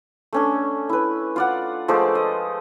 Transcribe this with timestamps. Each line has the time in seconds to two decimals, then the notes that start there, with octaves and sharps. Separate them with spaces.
0.33 A3 C#4 D4
0.89 E4 B4
1.36 F4 D5 F#5
1.88 F3 G#3 A3 D5
2.15 D#5